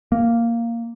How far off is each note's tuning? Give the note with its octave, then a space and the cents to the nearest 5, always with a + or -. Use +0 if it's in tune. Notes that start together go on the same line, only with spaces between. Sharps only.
A#3 -5